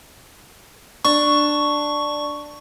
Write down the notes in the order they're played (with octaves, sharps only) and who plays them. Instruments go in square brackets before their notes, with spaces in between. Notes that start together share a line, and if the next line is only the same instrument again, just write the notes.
[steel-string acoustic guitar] D4 [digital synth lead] C#6